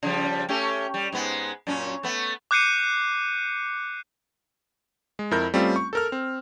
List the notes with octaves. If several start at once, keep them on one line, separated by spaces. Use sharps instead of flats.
C#3 F3 G3
A3 C#4 G4
G3
G#2 G#3 B3
F#2 A#2 C#4
A3 B3
D6 F#6 G6 C7 C#7 D#7
G#3
F2 E4 A#4 G6
G3 A3 C4 C#4 F4
C#6
A4 A#4 F6
C4